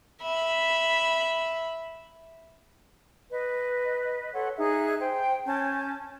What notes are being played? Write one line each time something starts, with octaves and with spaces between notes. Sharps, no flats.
E5 B5
B4 D#5
A4 C#5 F#5 C6
D#4 G#4 E5 F#6
C5 G5
C#4 G#5 A5 G6